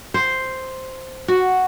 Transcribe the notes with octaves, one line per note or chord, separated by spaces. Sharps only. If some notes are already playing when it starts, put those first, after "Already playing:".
C5
F#4